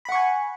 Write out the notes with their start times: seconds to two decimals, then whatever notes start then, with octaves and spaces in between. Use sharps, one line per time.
0.05 B5
0.09 F#5
0.12 C#6
0.15 G#5